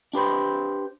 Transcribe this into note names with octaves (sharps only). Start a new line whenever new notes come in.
D4 G4 B4 C5